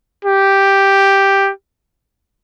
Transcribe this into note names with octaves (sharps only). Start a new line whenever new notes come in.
G4